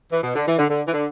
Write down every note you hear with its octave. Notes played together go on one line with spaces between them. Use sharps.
E3
B2
D3
E3
D3
D3
E3
D3